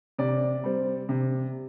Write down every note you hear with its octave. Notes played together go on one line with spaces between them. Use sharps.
C3 D5
G3 C4
C3